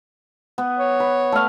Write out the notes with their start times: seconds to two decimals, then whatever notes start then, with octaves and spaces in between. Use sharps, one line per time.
0.58 B3
0.78 C#5
1.00 B4
1.32 A3 F5